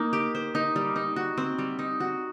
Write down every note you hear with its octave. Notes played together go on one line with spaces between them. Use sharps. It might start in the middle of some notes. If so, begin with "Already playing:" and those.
Already playing: A#3 D#4
G4
C5
D#4
G3
D#4
F#4
C4
G3
D#4
F#4